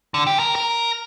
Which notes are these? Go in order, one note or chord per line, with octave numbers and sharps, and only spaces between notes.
D3
G4
A#4
A#4